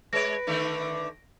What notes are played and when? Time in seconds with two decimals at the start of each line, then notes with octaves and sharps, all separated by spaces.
0.13 G#3 B4 C#5 A#6 D7
0.47 D3 D#3 A3